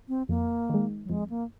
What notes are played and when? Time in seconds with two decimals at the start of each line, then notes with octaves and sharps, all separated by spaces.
0.09 C4
0.29 F2 A#3
0.69 D#3 G#3
1.04 F#3
1.09 F2 G#3
1.30 A#3